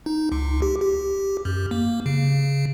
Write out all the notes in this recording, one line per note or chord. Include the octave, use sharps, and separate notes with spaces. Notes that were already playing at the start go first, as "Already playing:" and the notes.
D#4
C#2
G4
G4
F#2
A#3
C#3
C#3